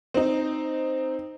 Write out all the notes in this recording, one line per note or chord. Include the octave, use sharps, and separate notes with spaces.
C4 D#4